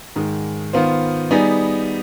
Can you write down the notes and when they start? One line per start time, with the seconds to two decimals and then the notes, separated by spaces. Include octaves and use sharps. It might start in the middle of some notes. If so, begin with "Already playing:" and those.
0.16 G#2 D#3 G#3
0.73 D#3 B3 F4 C5
1.31 G3 B3 D#4 G#4